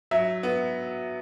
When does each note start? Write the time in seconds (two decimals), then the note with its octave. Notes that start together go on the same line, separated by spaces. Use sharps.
0.11 F#3 E5
0.43 B3